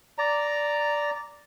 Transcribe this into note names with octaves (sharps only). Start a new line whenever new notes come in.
D5 A#5